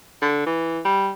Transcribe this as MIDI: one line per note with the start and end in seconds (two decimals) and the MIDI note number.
0.22 0.45 50
0.46 0.80 52
0.85 1.11 55